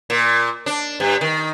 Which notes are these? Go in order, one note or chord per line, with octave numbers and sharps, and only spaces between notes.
A#2
D4
G2
D#3